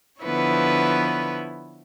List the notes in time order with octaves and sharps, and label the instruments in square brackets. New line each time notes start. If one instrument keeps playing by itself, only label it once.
[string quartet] D3 F3 B3 E4 B4 C#5